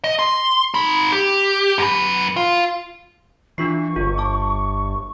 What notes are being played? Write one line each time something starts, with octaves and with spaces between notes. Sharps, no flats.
D#5
C6
D#4 B5
G4
F#2 B4
F4
E3 D4 F4 C#6 C7
G1 F4
A5 D6